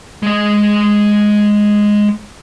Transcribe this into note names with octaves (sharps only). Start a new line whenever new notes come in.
G#3 D#5